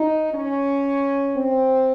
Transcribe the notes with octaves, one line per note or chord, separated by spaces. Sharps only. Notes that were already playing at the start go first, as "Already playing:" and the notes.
Already playing: D#4
C#4
C4